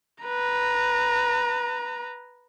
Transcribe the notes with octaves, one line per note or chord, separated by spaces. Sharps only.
B4 A#5